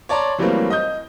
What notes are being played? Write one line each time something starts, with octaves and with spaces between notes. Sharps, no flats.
C#5 D5 A5 A#5 C6
E3 F#3 G3 A3 A#3 C4
D#5 D#6 G6